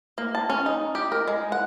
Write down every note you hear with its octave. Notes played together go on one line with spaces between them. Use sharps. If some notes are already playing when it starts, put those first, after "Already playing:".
A#3
A5
C#4
D#4
G4
A#4
G#3
F#5